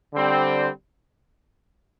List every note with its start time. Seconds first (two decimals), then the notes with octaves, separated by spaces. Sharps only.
0.13 D3 G3 C4